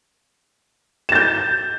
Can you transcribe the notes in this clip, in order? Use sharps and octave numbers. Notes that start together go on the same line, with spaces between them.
G6 A6 E7